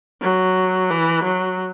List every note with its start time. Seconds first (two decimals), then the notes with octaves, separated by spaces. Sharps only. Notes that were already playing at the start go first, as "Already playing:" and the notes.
0.22 F#3
0.90 E3
1.24 F#3